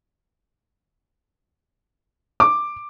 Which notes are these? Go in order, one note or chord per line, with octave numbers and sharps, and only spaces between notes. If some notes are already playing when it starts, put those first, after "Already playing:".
D6